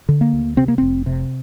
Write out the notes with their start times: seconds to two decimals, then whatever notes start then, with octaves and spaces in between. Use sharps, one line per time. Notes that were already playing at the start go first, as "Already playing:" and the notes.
0.09 D3
0.21 A#3
0.33 D2
0.57 C3 C4
0.68 A#3
0.78 F1 C4
1.06 C3